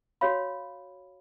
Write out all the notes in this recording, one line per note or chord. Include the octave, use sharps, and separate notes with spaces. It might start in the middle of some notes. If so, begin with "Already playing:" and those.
F#4 C#5 F5 B5